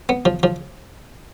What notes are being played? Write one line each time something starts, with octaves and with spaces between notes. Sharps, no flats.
B3
F3
F3